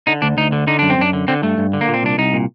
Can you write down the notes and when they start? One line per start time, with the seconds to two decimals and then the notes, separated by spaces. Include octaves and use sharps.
0.07 D3 D#4
0.22 D2 D4
0.37 D2 D#4
0.52 D3
0.67 D3 D#4
0.79 F#2 D4
0.90 C4
0.98 F#2 D4
1.13 D3
1.28 D3 C4
1.43 G2 A3
1.58 G2
1.73 D3
1.81 A#3
1.88 A#2
1.94 C4
2.03 C2 D4
2.18 C2 D#4
2.34 A#2